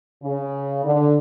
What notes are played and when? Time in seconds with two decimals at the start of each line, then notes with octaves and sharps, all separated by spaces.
0.23 C#3
0.84 D3